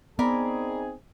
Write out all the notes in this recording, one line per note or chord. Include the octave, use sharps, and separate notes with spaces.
B3 C4 D#4 G#4 A#4 D5 B5